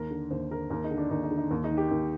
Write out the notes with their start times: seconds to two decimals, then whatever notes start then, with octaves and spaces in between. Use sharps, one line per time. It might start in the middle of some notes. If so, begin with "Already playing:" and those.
Already playing: D#2 A#4
0.11 D3
0.31 D#2 C5
0.51 D3 A#4
0.70 D#2 A#4
0.84 D#4
0.91 D3
0.98 D4
1.11 D#2 D#4
1.24 D#4
1.31 D3
1.38 D#4
1.51 D#2
1.64 D#4
1.71 D#3
1.77 G4
1.91 D#2